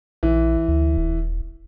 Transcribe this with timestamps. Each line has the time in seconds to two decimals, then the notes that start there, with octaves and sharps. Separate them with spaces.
0.23 A#1 E3
0.68 D2
0.97 D#1